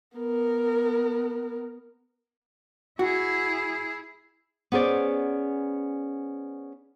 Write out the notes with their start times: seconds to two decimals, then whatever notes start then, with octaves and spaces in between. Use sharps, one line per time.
0.17 B3 A#4
2.99 E4 F#4 G#4
4.72 B3 C#4 G#4 C5 D5